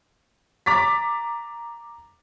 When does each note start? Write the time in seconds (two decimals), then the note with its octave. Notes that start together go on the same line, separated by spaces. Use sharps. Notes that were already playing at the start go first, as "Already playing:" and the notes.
0.66 A#5 D6 A6 B6